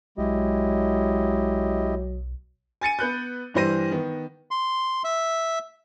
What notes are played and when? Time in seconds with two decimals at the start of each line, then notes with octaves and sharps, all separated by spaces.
0.18 B1 F#3 G#3 E4 G4 D#5
2.81 G#5 A6 C#7 D#7
2.99 B3 B4 F#6 G6
3.54 G2 E3 G3 C5 A#6 D#7
3.91 D#3 B3
4.51 C6
5.04 E5